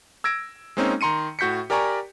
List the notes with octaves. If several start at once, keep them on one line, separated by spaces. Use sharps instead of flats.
E6 G#6 A#6 D7
G#3 A#3 C4 C#4 D#4
D#3 A#5 C6 C#7 D#7
A2 F#4 G6 B6 C#7
G4 A#4 D5 G#5 A#5 C#6